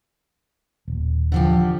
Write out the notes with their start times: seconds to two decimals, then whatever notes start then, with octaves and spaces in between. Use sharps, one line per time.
0.88 D#1
1.32 D3 F3 G4